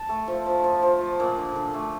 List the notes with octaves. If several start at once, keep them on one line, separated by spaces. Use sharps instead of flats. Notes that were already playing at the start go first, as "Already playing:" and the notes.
Already playing: A5
A3
F3
F3
F3
F3
F3
A#2
D3
D3
A3